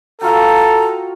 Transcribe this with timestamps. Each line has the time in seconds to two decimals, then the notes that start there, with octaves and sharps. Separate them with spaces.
0.21 F4 F#4 A4 G5 A#5